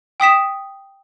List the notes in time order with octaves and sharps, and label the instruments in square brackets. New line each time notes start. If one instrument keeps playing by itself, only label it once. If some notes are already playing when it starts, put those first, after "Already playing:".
[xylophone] G5 D#6 B6 E7